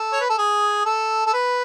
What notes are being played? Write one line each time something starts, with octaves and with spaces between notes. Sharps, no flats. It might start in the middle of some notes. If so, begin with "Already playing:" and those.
Already playing: A4
C#5
B4
A4
G#4
A4
A4
B4